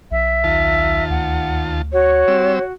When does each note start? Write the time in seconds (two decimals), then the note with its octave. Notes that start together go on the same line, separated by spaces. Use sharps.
0.11 B1 E5
0.44 D#2 F4 A5
1.10 D2 F#5
1.93 F#4 C#5
2.28 G3 C4 E6